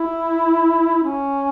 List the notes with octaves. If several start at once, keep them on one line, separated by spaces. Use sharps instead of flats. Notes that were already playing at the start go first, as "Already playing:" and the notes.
Already playing: E4
C#4